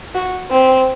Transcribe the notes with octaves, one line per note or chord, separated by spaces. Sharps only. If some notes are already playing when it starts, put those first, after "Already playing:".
F#4
C4